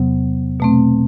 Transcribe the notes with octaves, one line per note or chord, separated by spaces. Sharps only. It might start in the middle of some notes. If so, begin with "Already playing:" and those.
Already playing: E2 C3 F#3 B3
B2 A3 C4